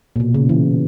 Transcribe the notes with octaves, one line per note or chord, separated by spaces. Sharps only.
A#2
B2
C#3
E3